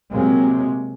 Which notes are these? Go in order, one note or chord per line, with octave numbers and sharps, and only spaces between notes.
C3 F#3 G#3 A#3